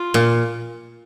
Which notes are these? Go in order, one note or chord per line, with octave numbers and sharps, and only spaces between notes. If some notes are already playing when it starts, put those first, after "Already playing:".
Already playing: F4
A#2